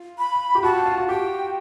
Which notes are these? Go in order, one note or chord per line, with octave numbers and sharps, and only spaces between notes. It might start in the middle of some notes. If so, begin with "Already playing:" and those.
Already playing: F4
B5
G4
F#4 A5
F4
F#4
G4 G5